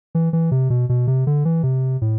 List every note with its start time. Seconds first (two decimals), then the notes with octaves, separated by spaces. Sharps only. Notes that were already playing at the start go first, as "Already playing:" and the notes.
0.15 E3
0.33 E3
0.51 C3
0.70 B2
0.89 B2
1.07 C3
1.27 D3
1.45 E3
1.63 C3
2.01 A2